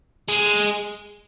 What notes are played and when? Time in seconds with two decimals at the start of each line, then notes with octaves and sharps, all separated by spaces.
0.29 G#3